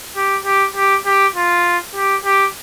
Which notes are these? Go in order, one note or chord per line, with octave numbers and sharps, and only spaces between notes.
G4
G4
G4
G4
F4
G4
G4